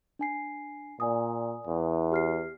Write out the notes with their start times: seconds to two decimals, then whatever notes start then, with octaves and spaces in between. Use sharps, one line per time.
0.19 D4 G#5 C7
1.00 A#2 D5 G#5 D#6
1.67 E2
2.12 G4 F6 C7